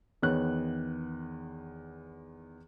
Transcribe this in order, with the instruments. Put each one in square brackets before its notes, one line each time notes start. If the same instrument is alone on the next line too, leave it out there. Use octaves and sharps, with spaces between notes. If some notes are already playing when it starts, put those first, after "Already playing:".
[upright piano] E2 D#3 B3 C#5 F#6